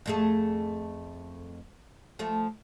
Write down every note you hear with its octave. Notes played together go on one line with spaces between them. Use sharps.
F2 A3 G#4
F3 A3